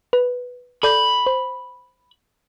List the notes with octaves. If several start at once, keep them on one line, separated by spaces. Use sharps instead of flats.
B4
A4 D5 B5 G6
C5